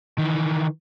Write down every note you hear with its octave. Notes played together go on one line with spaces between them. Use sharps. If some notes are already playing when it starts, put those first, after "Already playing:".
D#3 E3